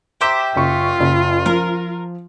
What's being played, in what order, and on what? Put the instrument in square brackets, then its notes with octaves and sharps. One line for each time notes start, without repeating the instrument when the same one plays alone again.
[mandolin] G4 C5 E5 [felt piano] A#5 D6 E7
[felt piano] F#1 C#6 [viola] F4
[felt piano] F#1
[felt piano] F3 [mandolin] A#4